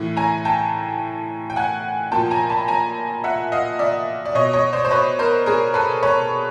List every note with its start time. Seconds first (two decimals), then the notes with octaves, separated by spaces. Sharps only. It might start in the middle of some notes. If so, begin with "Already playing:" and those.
Already playing: A2 E3
0.17 G#5 A#5
0.45 G5 A5
1.50 G5
1.56 F#5 G#5
2.12 A#2 F3 G5 A5
2.31 G#5 A#5
2.50 A5 B5
2.68 G#5 A#5
3.24 E5 F#5
3.52 D#5 F5
3.79 D5 E5
4.26 D5
4.35 B2 C#5 D#5
4.53 C#5 D#5
4.73 C5 D5
4.85 C5
4.91 B4 C#5
5.19 A#4 C5
5.46 G#4 A#4
5.74 A4 B4
6.03 B4 C#5